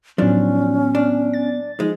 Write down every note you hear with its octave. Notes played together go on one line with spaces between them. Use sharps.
A2 D#3 F3 F#3 B3 C#4 D4
D4
A6
F3 G#3 D#4